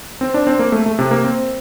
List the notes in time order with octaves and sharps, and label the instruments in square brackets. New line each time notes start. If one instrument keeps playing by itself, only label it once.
[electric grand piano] C4
D4
C4
A#3
A3
A3
C3
A#3
C4